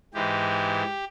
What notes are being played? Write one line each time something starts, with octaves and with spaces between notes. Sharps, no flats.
G#2 E3 G#3 G4